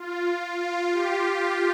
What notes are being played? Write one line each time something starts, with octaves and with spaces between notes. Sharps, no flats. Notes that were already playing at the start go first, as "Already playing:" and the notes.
Already playing: F4
F4
G4